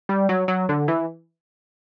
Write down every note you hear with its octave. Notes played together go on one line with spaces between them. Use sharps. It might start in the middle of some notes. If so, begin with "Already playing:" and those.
G3
F#3
F#3
D3
E3